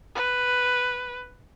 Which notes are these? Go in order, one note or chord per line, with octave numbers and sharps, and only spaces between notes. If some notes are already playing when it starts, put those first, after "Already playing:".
B4